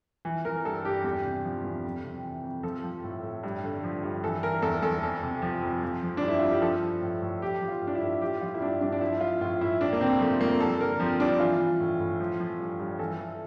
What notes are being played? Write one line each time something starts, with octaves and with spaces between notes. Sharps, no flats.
E3
E3 A#4
G2 A4
G2 G4
E2 G4
C3
F3
E2
F2
C3
E3
F2
F3 A4
F3
A2
A2
G2
D3
F3
G2
E3 A4
E3 A#4
E2 A4
E2 A4
F2 A4
C3
F3
F2
F3
F3
G2 D4
E4
G2 F4
G4
F3 A4
F3
A2
A2
F3 G4
F3
F4
A2
D4
E4
A2
F3 G4
F3 F4
E4
G2 D4
G2 D4
D4
F3 E4
F3 F4
A2 F4
A2 E4
F2 D4
A#3
C3 C4
F3 A3
F2 A#3
G2 A4
D3 A#4
F3 C4
G2 D4
E3 F4
E3
A2
A2
F3
F3
G2
G2
E3 A4
E3 A4